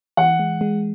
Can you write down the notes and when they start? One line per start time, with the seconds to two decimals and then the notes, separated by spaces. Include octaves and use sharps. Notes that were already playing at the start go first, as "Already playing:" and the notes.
0.17 E3 F#5
0.39 G#3
0.61 G#3